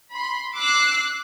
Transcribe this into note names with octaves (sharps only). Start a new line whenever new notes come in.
B5 C6
D6 E6 F#6 C7